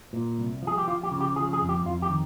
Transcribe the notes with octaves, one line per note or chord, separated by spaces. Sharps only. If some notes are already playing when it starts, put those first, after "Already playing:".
A#2
C2
F3
G#4
G4
F3 F4
G4
C#3
G4
F3 G#4
G#4
F2
G4
F2 F4
G4
D#3